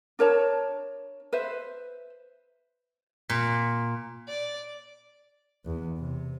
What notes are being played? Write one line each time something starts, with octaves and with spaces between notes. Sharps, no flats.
D4 A#4 C#5 A5
B4 C5 E5
A#2
D5
E2
C3